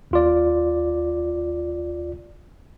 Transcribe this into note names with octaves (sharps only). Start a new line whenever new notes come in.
D#2 F4 D5